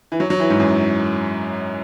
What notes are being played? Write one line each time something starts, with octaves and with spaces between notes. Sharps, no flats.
E3
F#3
F#3
E3
G#2
F#2